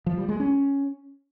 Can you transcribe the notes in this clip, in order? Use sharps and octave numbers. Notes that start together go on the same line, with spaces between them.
F3
G3
G#3
C#4